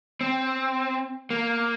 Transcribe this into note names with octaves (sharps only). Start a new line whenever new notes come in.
C4
A#3